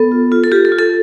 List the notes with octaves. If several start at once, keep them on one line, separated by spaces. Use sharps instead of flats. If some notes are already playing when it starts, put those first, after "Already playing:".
Already playing: B3 A4
F4
F4
A4
F4 G4
A4
F4
A4